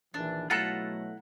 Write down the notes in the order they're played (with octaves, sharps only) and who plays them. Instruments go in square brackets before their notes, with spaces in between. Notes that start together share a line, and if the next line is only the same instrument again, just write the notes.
[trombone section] A#1 D#3 E3 [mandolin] D4
[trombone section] B2 F#3 A3 [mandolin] E4 F#5 A#5 [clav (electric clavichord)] F4 A4